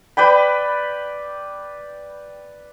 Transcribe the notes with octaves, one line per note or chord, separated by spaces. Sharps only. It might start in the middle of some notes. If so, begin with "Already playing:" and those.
B4 D5 G5 B5